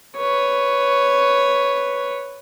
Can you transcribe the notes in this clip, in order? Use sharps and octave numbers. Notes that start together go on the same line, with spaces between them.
B4 C#5